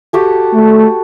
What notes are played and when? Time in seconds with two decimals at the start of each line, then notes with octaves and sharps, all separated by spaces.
0.13 F#4 G4 A4
0.54 A3